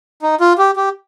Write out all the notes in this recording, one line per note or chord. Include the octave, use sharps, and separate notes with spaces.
D#4
F4
G4
G4